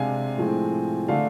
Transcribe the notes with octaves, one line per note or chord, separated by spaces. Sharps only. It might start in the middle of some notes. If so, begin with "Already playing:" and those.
Already playing: C3 G#3 D4 F5 G#5
A2 F3 G#3 C4
D3 A3 D4 F5